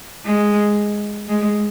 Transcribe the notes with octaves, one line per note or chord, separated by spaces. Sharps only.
G#3
G#3